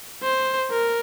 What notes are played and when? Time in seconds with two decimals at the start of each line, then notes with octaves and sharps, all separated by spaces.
0.23 C5
0.71 A#4